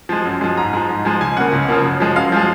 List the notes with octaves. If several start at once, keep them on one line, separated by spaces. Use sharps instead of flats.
F3 G#3
F#2
F3 G#3
G#2 A#5
F3 G#3
G#2
F3 G#3
C#2 G#5
C#3 F3 A#3 F#5
C#2
C#3 F3 A#3
F#2
F3 G#3
F#2 F5
F3 G#3